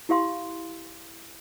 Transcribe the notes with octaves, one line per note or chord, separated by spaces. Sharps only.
E4 G4 F5 C6